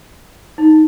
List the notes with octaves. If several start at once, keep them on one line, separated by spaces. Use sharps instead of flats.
D#4